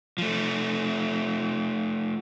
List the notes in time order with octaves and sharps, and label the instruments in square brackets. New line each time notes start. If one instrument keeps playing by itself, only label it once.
[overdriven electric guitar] F3 A3